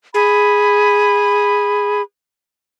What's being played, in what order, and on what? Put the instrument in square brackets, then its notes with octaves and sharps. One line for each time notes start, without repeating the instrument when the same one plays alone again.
[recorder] G#4 [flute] B5